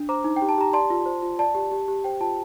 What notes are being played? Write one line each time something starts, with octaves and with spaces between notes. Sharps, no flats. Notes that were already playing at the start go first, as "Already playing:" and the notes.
Already playing: D4
C5 A#5 D6
D#4
G5
G4
A5
G4 A#5
D5 A5 C6
F4
C5
F4
D5 A5
G4
G4
G4
C5 G5
F4 A5